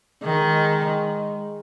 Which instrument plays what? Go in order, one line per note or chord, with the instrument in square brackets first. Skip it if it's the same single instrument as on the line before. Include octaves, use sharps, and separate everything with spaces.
[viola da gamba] D#3 [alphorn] G#3